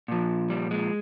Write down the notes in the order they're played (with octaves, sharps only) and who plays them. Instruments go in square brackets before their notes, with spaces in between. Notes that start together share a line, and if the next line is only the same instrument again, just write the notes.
[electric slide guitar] A#2 F3
G3
G#3